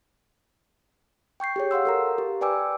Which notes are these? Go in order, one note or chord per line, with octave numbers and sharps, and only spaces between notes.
G5 C#6 G6 C7
G4 G#4 C#5
F5 F#5 C6 E6
A4 A#4 A#5
G4
B4 D5 G5 G#5 D6 E6